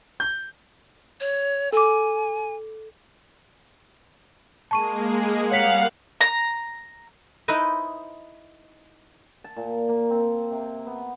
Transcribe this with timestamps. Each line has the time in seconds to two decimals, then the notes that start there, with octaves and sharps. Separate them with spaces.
0.20 G6
1.21 C#5
1.72 A4 G#5 D6
4.71 G#3 A#3 G#4 A5 C#6 D#7
5.52 G3 A#4 C#5 F5 F#5 B6 C#7
6.21 A#5
7.48 D#4 E4 B4 C5 D#5
9.44 A5
9.57 A#2
9.89 A#3
10.10 C4
10.51 C3
10.87 B3